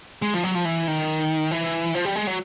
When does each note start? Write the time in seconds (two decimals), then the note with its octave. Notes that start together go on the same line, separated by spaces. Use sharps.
0.22 G#3
0.34 F3
0.43 F#3
0.55 F3
0.65 E3
0.88 D#3
1.51 E3
1.95 F3
2.05 G3
2.16 G#3
2.27 F#3